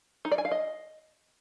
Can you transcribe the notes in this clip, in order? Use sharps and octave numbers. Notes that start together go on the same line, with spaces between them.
D#4
D5
G#5
F5
D#5